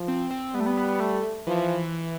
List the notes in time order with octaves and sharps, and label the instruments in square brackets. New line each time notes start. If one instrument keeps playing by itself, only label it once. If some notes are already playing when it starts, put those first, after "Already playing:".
Already playing: [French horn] F3
[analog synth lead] C4
C4
[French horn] G3 [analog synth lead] B3
[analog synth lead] A3
B3
B3
B3
A3
[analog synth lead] E3 [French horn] F3